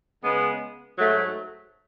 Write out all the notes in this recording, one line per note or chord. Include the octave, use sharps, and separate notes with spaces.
C#3 G#3 B3
G#2 F#3 A3